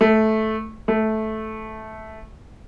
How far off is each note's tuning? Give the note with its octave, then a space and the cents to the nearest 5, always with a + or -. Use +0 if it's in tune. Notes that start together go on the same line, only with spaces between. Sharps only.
A3 -10
A3 -10